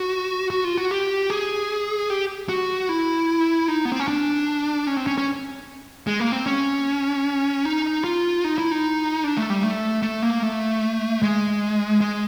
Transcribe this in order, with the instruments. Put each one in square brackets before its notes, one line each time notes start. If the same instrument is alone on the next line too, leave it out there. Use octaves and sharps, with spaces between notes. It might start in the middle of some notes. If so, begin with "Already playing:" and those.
Already playing: [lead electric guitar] F#4
F#4
F4
F#4
G4
G#4
G4
F#4
E4
D#4
B3
C4
C#4
D4
C#4
C4
C#4
C#4
G#3
A#3
C4
C#4
D#4
F4
D#4
E4
D#4
D4
A3
G3
A3
A3
A#3
A3
G#3
G#3